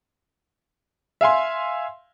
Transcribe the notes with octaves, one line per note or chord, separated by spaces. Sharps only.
E5 F5 G#5 C6